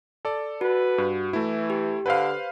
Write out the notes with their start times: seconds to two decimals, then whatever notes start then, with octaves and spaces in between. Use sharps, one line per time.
0.25 A4 D5
0.61 F#4 B4
0.98 G2
1.33 E3 A3 E4
1.70 G4
2.06 D3 B4 C5 F5